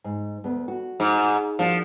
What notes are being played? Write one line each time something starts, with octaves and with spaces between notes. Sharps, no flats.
G#2
D2 B3
F#4
G#2
F3 A#3 D4 F#4